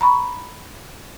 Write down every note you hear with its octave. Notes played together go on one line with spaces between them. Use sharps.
A#5 B5 C#6